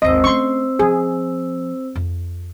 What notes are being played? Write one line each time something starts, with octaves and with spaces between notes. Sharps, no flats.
G#1 D#2 C4 C5 D#5 E6
A3 C#4 C6 C#6
F3 G#4
F2